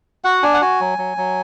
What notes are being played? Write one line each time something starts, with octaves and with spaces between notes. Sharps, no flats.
F#4 F#5
D4 G#5
F#5
F#4 G#5
F#3
F#3
F#3